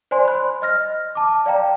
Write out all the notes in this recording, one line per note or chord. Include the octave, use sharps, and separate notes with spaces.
C5 D5 G#5 C6
B5 F#6
D#5 F6 A#6
A5 D6
D5 F5 G5 A#5